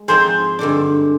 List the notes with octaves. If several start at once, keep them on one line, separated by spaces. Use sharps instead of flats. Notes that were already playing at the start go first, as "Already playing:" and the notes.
Already playing: G#3
G#2 F3 C4 D#4 G#4 C5
G2 D3 G#3 D4